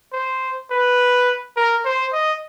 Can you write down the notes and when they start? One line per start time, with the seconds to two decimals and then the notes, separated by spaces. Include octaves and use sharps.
0.12 C5
0.71 B4
1.57 A#4
1.85 C5
2.13 D#5